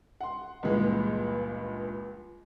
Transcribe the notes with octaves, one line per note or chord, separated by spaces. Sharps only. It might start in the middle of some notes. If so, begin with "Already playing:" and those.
F#5 C6
C#2 G2 A#2 E3 G#3